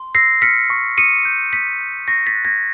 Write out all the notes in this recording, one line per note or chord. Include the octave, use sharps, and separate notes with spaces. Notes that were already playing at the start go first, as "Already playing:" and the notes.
Already playing: C6
E6 A#6 C7
F6 B6 C#7
C#6
D#6 C#7 D#7
G6
D#6 B6 C#7
G6
C#6 A#6 C7
A6 B6
F#6
G#6 A#6